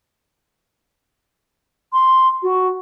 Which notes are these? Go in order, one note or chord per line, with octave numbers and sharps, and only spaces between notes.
C6
F#4